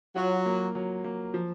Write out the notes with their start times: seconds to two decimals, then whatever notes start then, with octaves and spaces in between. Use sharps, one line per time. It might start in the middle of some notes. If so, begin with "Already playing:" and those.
0.16 F#3 F4
0.46 A#3
0.75 F#3
1.04 A#3
1.34 F3